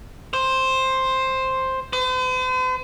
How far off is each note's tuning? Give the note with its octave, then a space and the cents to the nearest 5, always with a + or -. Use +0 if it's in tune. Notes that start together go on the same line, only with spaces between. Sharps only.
C5 +5
C5 -45